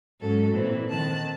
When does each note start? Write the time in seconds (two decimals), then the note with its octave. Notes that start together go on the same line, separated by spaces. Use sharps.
0.20 G#2 F#3 C#4 A4
0.53 A#2 E3 C4
0.88 D#3 C4 A5 F#6